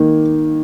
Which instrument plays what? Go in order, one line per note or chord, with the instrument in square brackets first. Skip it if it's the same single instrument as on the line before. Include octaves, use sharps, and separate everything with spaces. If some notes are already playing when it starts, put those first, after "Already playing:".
Already playing: [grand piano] D#3 [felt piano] A#3